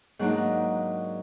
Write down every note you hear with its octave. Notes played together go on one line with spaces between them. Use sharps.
G#2 F#3 A#3 D4 D#4